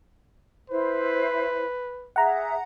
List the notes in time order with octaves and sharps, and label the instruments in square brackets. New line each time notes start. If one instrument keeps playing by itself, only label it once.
[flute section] E4 C5 [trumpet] B4
[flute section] G#4 E5 [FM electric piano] F#5 A#5